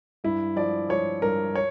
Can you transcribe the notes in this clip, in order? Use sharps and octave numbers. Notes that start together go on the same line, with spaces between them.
G2 E4
F3 D5
F3 C#5
G2 A#4
C#5